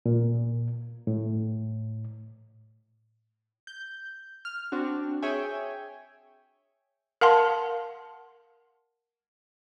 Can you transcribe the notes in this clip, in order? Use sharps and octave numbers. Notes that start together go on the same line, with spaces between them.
A#2
A2
G6
F6
C4 D4 F#4
G#4 C#5 E5 G5 G#5
A#4 F5 F#5 A5 C6